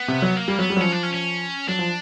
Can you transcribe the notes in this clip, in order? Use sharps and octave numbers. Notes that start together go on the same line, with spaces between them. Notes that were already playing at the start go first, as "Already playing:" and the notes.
Already playing: B3
C3
F#3
A#3
G3
F#3 B3
G3
F#3
F3 C#4
D4
C#4
C#4
F#3 D4
F3